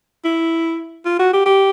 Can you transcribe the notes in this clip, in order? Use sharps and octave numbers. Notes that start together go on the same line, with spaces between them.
E4
F4
F#4
G4
G4